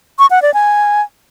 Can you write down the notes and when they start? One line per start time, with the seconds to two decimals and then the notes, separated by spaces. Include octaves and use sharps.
0.19 C#6
0.31 F#5
0.42 D5
0.54 G#5